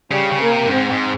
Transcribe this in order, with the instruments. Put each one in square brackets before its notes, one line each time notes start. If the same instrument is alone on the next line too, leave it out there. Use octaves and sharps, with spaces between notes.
[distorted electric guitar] C#3 [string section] G3
[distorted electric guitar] C#3
[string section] A#3
[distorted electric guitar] C3
G2
[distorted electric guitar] G#2 [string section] C4
[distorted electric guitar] G#2